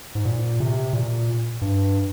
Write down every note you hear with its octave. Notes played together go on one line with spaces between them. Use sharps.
G#2
A#2
C3
A#2
G2